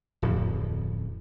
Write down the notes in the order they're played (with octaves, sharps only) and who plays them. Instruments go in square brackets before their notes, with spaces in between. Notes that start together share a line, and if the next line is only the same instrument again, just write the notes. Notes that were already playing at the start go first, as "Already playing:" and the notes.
[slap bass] D1 F2 C#3